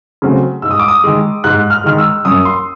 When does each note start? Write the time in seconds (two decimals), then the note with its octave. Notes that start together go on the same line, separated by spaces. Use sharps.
0.22 C#3 F#3 A3 C4
0.62 G#2 E6
0.71 D#6
0.79 D6
0.88 D#6
1.04 D#3 G#3
1.44 G#2 F#6
1.70 F6
1.84 D#3 G#3 F6
1.98 E6
2.25 F#2 D#6
2.45 C6